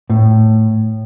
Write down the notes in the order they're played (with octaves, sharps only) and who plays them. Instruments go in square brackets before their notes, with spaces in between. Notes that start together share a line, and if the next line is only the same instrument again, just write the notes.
[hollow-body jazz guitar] A2